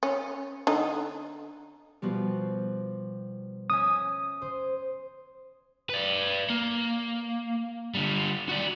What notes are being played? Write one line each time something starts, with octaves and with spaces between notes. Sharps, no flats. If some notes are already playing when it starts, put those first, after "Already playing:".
C#4
D3 D#4
B2 F3 G3
C#4 E5 G#5 D#6
C5
B4 D5
A#3
D3 G3
F#4 D5